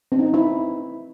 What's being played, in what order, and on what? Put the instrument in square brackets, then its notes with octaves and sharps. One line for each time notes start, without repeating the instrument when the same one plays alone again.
[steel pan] C4
D#4
C4
E4